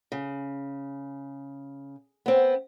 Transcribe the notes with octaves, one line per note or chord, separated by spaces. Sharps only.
C#3
B3 C4